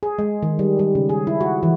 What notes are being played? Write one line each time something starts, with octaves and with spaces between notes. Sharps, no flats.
G#4
G#3
D#3
G3
G3
C#3
G#4
E4
F#4
E3